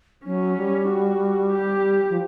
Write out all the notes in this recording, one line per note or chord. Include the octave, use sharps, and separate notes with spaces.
F#3 C#4
G3
F#4
G4
F3